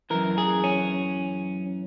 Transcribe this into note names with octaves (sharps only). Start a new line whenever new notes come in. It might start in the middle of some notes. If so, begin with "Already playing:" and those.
F#2 E3 A#4
G#4
C#4